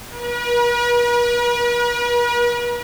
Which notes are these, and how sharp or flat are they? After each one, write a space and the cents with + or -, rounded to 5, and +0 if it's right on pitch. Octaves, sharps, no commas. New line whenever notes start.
B4 -45